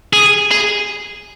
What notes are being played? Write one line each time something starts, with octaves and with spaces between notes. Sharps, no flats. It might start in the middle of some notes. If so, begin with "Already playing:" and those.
G#4
G#4